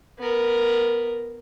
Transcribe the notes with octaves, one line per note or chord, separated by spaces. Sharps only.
B3 A#4